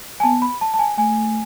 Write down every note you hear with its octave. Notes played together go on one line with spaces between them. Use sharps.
G#5
B3 A5
B5
A5
A5
G#5
A3 G#5